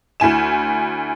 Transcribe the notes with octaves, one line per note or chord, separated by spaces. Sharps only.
D2 E4 G#5 E7